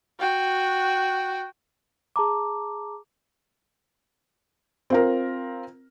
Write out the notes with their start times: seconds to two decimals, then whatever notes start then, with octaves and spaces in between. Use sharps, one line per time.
0.19 F#4 G5
2.16 G#4 A5 A#5 D6
4.90 C4 F4 A#4